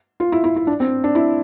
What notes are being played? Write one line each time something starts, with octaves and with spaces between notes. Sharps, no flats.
F4
E4
E4
E4
D4
C4
D4
E4